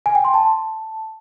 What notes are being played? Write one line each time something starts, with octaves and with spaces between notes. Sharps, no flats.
G#5
G5
C6
A5